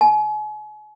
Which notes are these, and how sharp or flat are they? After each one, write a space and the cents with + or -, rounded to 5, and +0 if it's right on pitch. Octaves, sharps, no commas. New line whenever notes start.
G#5 +40